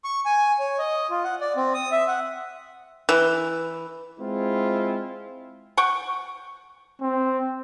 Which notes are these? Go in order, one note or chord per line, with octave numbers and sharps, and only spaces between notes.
C#6
G#5
C#5
D#5
F4
F#5
D5
C4
D#6
E5
F#5
E3
G#3 C4 E4 F4
F#5 G5 C#6
C4